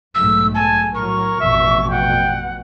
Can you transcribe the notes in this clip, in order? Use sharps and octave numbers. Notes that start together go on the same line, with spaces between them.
B1 G#2 A3 E6
G#5 A5
A2 F#3 A#4 C#6
A1 F2 B2 E5
F#5 G5